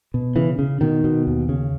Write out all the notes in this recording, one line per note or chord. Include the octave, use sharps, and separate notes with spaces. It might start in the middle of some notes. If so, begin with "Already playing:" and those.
B2
C#3 E3
C#3
B2 D#3
B2
D#2
C#3